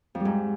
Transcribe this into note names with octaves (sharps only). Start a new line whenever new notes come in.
F2
G3
G#2